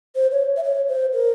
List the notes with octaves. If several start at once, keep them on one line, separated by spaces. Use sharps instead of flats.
C5
C#5
E5
C#5
C5
A#4